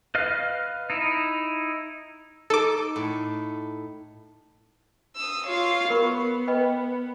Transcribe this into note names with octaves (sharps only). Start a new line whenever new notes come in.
B4 D#5 F5 F6
D#4 E4
D#4 A4 D6
A2
D#6 E6
F4 C#5 F5
B3 A#4 B5 C#6
B4 D#5 G5